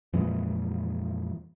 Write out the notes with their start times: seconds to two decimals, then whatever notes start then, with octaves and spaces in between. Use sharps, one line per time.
0.13 F2 A#2 E3 G#3